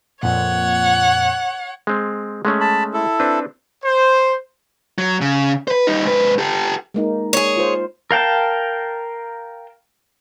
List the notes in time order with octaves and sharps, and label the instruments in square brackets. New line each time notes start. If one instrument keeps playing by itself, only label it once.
[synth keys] F2 A#2 [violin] C#5 F#5
[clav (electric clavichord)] G#3 C4
G#3 A3 C#4
[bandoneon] A5 B5
E4 A4
[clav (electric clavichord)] C4 D4 B4
[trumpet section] C5
[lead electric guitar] F#3
C#3
B4 C5
G3 D#4
G#2 B4
G4 A4
[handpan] G#3 A#3 D#4
[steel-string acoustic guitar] G#4 C#5
[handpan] F4 C5
[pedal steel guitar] A#4 F5 G5 A5